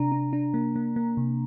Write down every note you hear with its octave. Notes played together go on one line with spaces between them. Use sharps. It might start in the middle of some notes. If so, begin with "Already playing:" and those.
Already playing: C3 D4 A#5
D4
D4
A#3
A#3
A#3
C3